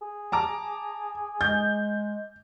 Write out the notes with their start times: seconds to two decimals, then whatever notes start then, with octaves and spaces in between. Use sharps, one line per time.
0.02 G#4
0.32 A5 A#5 D6
1.41 G#3 G6